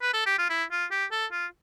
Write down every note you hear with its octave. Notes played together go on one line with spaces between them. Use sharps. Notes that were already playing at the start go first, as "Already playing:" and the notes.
B4
A4
G4
F4
E4
F4
G4
A4
F4